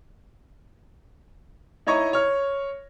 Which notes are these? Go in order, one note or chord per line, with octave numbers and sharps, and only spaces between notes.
D#4 E4 C#5 D#5 A#5 C#6
C#5 F6